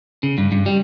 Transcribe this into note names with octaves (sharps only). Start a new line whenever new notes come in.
C#3
G2
G2
G3